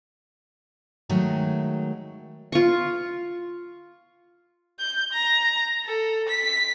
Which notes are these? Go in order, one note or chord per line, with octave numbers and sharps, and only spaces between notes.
D#3 F#3 G#3 A3
F4 C#6
G6
A#5
A4
B6